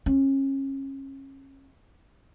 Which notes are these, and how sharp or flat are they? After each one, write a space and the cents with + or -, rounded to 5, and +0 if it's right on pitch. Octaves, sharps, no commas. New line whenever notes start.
C#4 -30